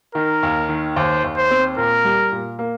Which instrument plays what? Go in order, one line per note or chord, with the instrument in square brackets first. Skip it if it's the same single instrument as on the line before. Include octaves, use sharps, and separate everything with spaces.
[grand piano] D#3 [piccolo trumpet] A#4
[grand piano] D#2
D#3
[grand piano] D#2 [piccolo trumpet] C5
[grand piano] D#2
[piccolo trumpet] C5
[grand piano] C4
[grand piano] A#2 [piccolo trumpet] A#4
[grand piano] G3
A#2
A#3